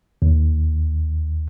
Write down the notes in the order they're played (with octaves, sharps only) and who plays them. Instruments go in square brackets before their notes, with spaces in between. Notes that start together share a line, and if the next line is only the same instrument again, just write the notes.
[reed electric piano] D#2